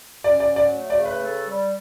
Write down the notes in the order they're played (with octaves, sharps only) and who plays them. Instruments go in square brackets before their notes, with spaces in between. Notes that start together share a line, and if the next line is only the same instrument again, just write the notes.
[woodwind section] C#4 [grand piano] D5
[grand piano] D5
[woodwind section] F#3
[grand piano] D5
[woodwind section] A3
[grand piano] D5
[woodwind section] C#3
[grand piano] B4
[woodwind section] A4
G3